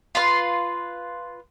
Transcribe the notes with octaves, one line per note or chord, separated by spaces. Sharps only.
F4 B4 C6